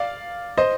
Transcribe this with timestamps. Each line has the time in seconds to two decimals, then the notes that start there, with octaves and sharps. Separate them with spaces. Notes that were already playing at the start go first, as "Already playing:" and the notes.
Already playing: D5 F5
0.57 C5 D#5